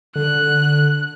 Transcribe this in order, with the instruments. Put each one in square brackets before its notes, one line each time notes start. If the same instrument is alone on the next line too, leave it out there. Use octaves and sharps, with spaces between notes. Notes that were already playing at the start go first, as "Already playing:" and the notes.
[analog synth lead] D3 [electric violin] F#6